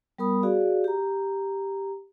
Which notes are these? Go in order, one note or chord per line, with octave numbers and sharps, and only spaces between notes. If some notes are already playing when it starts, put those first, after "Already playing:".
G3 B3 A#4 B5 D#6
F#4 G#4 D5 F5
G4 A#5